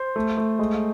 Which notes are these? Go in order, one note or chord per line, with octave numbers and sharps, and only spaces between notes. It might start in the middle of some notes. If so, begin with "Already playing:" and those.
Already playing: C5
A3
A3
G#3